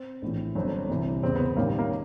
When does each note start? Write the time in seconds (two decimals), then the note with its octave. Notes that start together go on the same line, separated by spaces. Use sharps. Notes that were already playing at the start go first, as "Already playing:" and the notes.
Already playing: C4
0.22 A#1 A2 E3
0.55 G1 F#2 D3 C4
0.90 C2 C3 E3
1.23 F#1 E2 C#3 C4
1.35 B3
1.46 B3
1.57 A1 G2 D#3 A#3
1.79 A#3